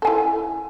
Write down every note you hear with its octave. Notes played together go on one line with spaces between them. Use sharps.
E4 A4 G#5